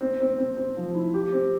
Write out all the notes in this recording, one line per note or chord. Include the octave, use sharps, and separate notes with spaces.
C4
C4
C4
C4
F3
E4
G4
C4